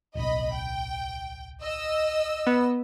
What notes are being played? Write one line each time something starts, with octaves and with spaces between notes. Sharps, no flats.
D1 B1 D#5 B5
G5
D#5 E6
B3